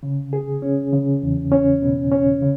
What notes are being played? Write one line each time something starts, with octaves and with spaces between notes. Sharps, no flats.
C#3
G#4
C#4
C#3
E2
C#4
B2
C#4
C#3